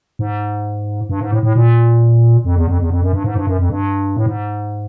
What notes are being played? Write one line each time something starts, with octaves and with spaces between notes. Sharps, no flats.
G#2
G2
G#2
A2
A2
A#2
F2
E2
F2
E2
F2
F#2
G2
G#2
G2
F#2
F2
G2
A2
G#2